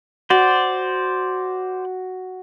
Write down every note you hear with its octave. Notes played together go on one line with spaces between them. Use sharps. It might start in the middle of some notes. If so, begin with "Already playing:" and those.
F#4 C5 D5